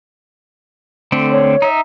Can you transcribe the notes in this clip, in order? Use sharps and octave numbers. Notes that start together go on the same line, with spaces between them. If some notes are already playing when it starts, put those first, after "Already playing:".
D3 A3 C4
C#5
D#4 E5